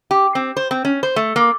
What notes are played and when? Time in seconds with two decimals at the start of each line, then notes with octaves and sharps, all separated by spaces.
0.11 G4
0.35 C4
0.57 C5
0.71 C4
0.85 C#4
1.03 C5
1.16 A3
1.36 A#3